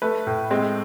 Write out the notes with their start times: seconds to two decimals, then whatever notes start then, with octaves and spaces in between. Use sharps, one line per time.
0.02 A3 B4
0.27 A2
0.51 G#3 C4